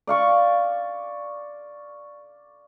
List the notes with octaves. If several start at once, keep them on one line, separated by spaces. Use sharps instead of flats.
D5 F5 C#6 D6